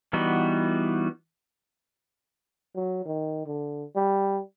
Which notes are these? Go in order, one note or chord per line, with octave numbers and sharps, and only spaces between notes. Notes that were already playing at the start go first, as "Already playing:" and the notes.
E3 G3 B3 D#4 F#4
F#3
D#3
D3
G3